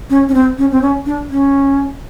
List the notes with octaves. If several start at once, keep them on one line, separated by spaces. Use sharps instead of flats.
C#4
C#4
C4
C#4
C4
C#4
D4
C#4